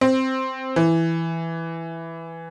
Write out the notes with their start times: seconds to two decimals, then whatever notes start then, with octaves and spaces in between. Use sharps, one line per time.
0.01 C4
0.76 E3